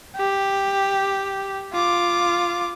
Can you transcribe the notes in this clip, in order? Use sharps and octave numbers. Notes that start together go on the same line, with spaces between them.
G4
F4 D6